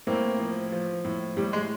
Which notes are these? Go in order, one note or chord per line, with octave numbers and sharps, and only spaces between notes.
A2 A#3 C4
F3
F3
A2
A2 G3
G#3